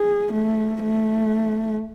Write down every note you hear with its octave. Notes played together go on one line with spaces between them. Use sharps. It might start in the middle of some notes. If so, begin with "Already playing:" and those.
Already playing: G#4
A3
A3